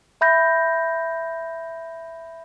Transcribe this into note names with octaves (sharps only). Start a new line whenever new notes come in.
E5 B5 G6 A#6